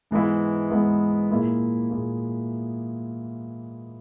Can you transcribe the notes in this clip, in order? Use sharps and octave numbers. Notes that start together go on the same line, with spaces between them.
G#2 E3 G#3 B3 E4
G#2 E3 G#3 B3 E4
A#2 A#3 E4 G#4
A#2 A#3 E4 G#4